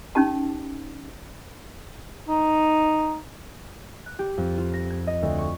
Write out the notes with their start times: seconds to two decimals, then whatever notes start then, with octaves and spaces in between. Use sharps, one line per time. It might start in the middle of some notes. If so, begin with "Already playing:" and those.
0.15 C#4 D#4 G4 A5
2.28 D#4
4.06 F#6
4.19 G4
4.38 F2
4.58 F4
4.74 A#6
4.90 G#6
5.07 D#5
5.23 D2
5.38 C#6